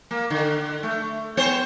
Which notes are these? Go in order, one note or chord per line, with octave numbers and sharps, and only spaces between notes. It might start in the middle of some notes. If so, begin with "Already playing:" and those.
A#3
D3
A3
B3 C5 C#5